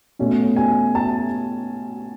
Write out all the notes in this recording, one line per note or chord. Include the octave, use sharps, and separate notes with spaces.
B2 A3 C#4
G#5
A5